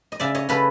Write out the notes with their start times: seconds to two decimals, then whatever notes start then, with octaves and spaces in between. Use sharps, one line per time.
0.12 D#5
0.20 C#3 D5 E5
0.35 C#5 D#5
0.49 C#3 A4 B4